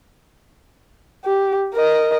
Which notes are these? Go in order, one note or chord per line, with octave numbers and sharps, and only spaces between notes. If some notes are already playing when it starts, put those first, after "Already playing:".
G4
A#4 D#5